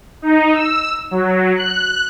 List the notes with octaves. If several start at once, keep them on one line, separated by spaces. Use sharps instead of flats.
D#4
E6
F#3
F#6